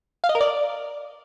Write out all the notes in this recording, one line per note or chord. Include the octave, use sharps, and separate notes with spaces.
F5
D#5
A#4
D5